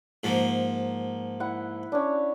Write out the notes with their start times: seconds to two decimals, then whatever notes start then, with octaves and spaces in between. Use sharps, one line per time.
0.24 G#2 F3 A#3
1.40 E4 F#5
1.92 C#4 D4